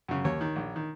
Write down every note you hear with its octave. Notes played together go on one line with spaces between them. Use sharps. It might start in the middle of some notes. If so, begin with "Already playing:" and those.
F#2 C#3
D#2 C#5
D#3
A#1
D#3